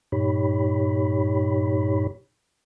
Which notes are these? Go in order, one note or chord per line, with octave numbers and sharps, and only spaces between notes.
G2 A#2 D#4 G4 C#5 B5